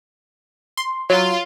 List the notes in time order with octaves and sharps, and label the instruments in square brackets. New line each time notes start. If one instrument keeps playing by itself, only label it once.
[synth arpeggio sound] C6
[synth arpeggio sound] F#3 [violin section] F4